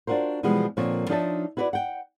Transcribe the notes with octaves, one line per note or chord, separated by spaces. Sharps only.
D4 F4 F#4 A#4 C5
B2 E3 F3 G3 G#3 B3
A#2 D3 F3 A#3 C4 C#5
F3 D4 D#4 C#5 E5 A5
E4 F#4 B4 C#5 D5
F#5 G5